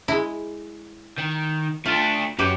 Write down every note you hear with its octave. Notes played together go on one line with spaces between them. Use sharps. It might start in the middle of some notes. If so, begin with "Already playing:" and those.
G#3 E4
D#3
A3 D4 F4
F#2 F#3 G4 B4